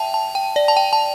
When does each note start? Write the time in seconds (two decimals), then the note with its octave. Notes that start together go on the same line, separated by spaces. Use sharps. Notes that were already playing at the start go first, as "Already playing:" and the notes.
Already playing: E5 G5 A5
0.14 A5
0.35 G5
0.56 D5
0.68 A5
0.77 G5
0.93 A5